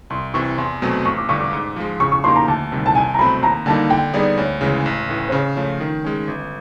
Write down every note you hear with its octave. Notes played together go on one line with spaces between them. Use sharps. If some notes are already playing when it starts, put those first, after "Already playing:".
C2 C6
C3 E3 C#6
E2 C6
B2 F#3 A3 C4
A1 C#6
D6
G2 D3 C#6
D6
G#2
F3 G#3
C#3 C#6
C#6
F3 A#3 D#4 G4 C6
A#5
D2 A5
C3 D#3 G3
A5
C2 G#5
A#5
B2 F#3 A3 C4 B5
D#2 A#5
D3 G3 A#3 D#4 A5
D3 G5
G3 B3 D#4 G#4 D5
D2 C#5
C#3 E3 G#3 C#5
A1
A2 E3
C5
C#3 C#5
F3 A3 C#5
D#3
G#3 C#4
G1